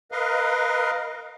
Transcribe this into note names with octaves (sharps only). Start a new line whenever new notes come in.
A#4 B4 D#5 F5